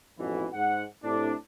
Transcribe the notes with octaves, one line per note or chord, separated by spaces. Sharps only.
A1 F2 G#2 B2 E3
G#2 F#5
A2 C3 D4